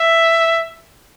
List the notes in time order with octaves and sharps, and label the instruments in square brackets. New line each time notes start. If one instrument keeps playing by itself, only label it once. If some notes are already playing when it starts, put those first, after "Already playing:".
Already playing: [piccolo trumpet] E5